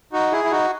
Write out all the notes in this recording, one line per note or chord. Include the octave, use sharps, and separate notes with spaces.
D#4 F#4
E4 G#4
E4
D#4 F#4